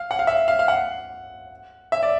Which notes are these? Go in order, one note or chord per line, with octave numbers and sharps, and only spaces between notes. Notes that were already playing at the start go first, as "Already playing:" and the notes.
Already playing: F5
F#5
F5
E5
F5
F5
F#5
E5
D5